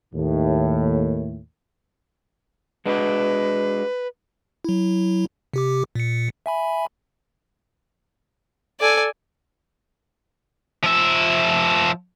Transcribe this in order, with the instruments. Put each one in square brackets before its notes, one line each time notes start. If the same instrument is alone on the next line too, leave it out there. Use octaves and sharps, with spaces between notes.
[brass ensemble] D#2 A2
[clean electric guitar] G#3 D4 F#4 [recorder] B4
[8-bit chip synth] F#3 E4
C3 G4 D6
A#2 C#7
E5 G#5 B5
[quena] A4 [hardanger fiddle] D5 G#5
[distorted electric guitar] F3 E5